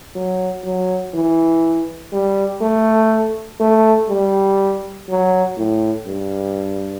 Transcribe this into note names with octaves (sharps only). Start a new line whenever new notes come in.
F#3
F#3
E3
G3
A3
A3
G3
F#3
A2
G2